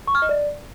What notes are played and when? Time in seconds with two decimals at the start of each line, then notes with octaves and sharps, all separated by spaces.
0.07 C#6
0.15 F6
0.22 D#5
0.29 D5